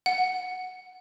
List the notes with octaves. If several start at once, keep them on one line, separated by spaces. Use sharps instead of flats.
F#5